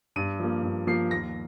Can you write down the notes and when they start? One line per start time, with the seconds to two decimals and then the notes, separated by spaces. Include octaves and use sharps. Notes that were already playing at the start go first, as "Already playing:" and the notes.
0.16 G2 D#7
0.40 F3 A#3
0.63 G2
0.87 F3 A#3 C7
1.11 D#2 A#6